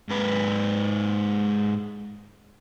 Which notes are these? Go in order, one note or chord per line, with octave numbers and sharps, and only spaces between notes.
G#2 B4